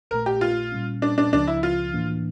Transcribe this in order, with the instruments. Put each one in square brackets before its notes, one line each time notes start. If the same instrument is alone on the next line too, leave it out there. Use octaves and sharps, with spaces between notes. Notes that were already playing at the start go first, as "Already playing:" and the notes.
[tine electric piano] A#1 A#2 A3 [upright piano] A#4
[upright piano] G4
F4
[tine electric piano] A#2 G3 C#4
[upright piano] D4
D4
[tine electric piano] C#2 C#3 F3 [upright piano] D4
[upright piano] E4
F4
[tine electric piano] A2 E3 A#3 D4